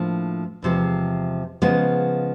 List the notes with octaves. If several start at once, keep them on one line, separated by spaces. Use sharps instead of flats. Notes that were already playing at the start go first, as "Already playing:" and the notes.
Already playing: A2 F3 A#3 D4
E2 C3 F3 G#3
C#3 F3 G#3 B3